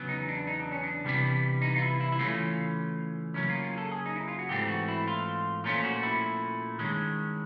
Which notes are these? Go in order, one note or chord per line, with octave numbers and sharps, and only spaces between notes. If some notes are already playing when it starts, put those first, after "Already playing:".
Already playing: E2 C#3 F#3 B3
D#4
D4
D#4
D4
C#4
D4
C3 E3 G3 B3
D#4
F4
E4
E4
E4
C#3 E3 A3 C#4 F4
C#3 F#3 A#3 C#4 E4
F4
F4
G#4
A4
G#4
D#4
E4
F4
F#4
G#2 E3 A3 C4 G4
F#4
E4
F4
A#2 F3 A3 C#4 F4
F#4
E4
G2 D#3 G#3 C#4